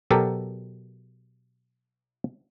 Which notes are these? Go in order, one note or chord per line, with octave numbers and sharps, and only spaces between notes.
B2 F#3 G4 A4 A#4